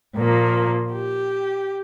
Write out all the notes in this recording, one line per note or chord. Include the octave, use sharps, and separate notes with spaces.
A#2 F3 A#3
G4